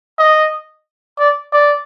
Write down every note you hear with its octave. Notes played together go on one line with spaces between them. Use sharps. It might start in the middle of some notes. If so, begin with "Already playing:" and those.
D#5
D5
D5